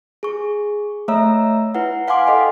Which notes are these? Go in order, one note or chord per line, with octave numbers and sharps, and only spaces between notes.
G#4 C#6
A3 C#5 E5 A#5 E6
E4 B4 F#5
F5 F#5 G#5 C6 D6
A4 D#5 G5